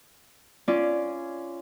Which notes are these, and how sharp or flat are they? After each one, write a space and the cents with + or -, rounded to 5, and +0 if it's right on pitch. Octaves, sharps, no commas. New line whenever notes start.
C#4 +0 F4 -25 D5 +0